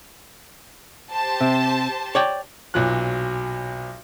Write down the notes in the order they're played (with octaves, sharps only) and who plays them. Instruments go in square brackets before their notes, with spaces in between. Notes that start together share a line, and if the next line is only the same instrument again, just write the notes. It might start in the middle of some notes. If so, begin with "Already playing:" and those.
[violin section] G4 C5 A5
[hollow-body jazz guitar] C3
C#5 D5 G5
[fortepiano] B1 A#2 F#3 F#6